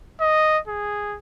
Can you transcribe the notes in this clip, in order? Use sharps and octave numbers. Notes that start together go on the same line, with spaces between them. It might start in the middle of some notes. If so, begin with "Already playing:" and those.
D#5
G#4